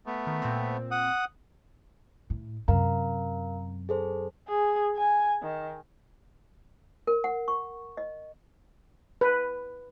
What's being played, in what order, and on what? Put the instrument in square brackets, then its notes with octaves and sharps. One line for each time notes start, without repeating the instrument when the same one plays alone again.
[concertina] A3 B3
[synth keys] D#3
A#2 C4
[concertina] F#5 D#6
[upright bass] A2
[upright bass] F#2 C3 [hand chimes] A#4 F5 A#5
[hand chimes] G#4 A4 C5
[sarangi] G#4
G#5
D#3
[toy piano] A#4
F#5
C#6
D#5
[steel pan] B4